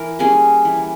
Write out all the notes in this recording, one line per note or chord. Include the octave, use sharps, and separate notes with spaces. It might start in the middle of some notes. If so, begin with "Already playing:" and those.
Already playing: E3 A#4
G3 A#3 C#4 G#4
E3